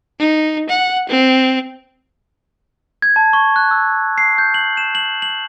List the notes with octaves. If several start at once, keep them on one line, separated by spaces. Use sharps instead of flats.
D#4
F#5
C4
G#6
A5
C#6
F#6
E6
C7
G6
F#7
E7
F#7
F#7